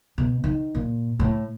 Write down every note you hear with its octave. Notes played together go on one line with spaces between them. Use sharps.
B2
D#3
A#2
A2